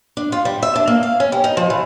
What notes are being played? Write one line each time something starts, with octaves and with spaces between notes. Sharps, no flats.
D4
F4
G3
E5
D4
A#3
F5
C#4
G3
D#4
F3
E3